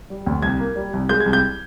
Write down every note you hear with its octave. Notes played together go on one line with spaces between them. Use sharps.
G3
D2
C2 G#6
A#3
G3
C2
G#3 G6
G#6
C2
G6